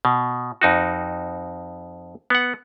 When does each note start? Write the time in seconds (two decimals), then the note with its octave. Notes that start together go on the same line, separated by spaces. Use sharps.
0.05 B2
0.61 F2 D#4 F#4
2.30 B3 F#5